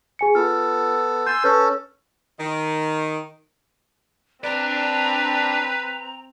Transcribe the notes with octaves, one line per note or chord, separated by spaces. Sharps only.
G#4 G#5 C#7
B3 F4 A4 F6
G#5 C6 E6 G6 A6
C#4 A4 B4 F6 G6
D#3
C4 D4 B4 D5 A#5